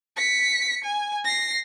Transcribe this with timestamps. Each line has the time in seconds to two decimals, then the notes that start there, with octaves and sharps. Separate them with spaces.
0.17 B6 C#7
0.84 G#5
1.24 A#6 C7